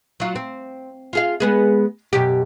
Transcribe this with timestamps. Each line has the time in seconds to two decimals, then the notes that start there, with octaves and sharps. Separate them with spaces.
0.20 F#3 F4
0.35 C4
1.13 F4 G#4 F5
1.40 G#3 B3 G#4
2.13 F#2 B2 G4